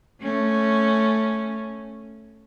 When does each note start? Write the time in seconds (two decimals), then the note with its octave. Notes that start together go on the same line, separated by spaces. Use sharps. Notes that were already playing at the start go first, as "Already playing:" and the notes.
0.21 A3 C#4